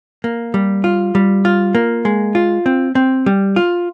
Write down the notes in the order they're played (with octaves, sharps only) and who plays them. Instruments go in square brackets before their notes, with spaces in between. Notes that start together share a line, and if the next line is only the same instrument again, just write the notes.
[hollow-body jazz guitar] A#3
G3
F4
G3
F4
A#3
G#3
F4
C4
C4
G3
F4